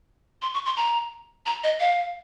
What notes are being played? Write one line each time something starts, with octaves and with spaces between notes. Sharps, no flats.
C6
C#6
C6
A#5
A#5
D#5
F5